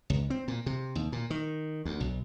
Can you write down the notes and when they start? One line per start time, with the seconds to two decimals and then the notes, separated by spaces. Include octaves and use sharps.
0.10 C#2
0.30 C4
0.48 A#2
0.66 C3
0.95 D#2
1.12 A#2
1.30 D#3
1.85 D2
2.00 B1